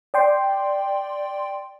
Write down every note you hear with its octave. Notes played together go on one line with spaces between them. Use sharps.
D5 G5 C6